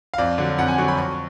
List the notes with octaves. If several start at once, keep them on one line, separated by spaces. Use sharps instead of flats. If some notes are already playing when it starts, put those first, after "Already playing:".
F5
F2 D5
D3 F#3
F2 F#5
G#5
D3 F#3 C#6
B5
F2 C#6